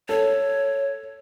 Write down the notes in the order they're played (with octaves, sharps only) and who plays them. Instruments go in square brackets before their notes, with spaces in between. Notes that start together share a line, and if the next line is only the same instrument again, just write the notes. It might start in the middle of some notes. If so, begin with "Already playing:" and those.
[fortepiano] A4 [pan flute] C#5